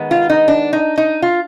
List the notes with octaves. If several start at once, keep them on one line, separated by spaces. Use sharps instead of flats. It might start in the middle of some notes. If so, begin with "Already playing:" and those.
Already playing: D#3 G#3 B3
F4
D#4
D4
D#4
D#4
F4